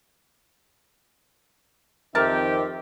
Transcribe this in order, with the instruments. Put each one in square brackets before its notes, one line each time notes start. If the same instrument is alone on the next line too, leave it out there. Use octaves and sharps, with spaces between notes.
[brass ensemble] F2 D#3 G4 [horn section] C4 D#4 E5 [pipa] A#4 A5